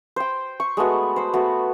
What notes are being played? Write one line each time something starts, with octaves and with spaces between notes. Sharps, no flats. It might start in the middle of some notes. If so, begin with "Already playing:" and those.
C5 G5
C#6
G#3 A3 B3 F#4
C5 B5
A3 B3 F#4